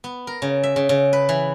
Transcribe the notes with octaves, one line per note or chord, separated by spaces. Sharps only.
B3
A#4
C#3
E5
C#3
C#3
B4
E3